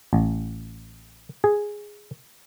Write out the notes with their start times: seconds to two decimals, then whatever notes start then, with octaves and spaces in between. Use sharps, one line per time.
0.13 A1
1.44 G#4